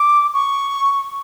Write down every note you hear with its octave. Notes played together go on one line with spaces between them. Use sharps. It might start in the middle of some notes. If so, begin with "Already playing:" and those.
Already playing: D6
C#6